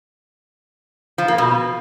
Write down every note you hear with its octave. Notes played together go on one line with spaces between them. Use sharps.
F3
A#3
B2